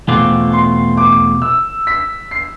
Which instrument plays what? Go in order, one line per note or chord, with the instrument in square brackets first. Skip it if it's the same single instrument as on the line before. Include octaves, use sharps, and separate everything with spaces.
[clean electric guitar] E2 B2 A3 C4 F4 [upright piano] D6
[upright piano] C6
D6
E6
B6
C7